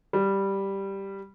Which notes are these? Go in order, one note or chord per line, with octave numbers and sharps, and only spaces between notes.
G3